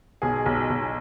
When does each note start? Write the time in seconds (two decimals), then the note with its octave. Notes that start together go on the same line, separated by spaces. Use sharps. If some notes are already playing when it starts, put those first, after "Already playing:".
0.22 B1 G#4
0.46 B1
0.70 B1